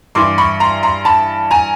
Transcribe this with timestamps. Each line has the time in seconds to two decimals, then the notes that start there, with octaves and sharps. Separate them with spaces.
0.15 G2 E3 C6 D6
0.38 B5 C#6
0.60 A#5 C6
0.83 A#5 C6
1.05 A5 B5
1.51 G#5 A#5